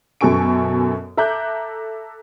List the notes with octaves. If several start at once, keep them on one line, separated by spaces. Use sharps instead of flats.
F#2 B2 A4 G#5 C#6 D7
A4 E5 A#5 D6 F#6 G6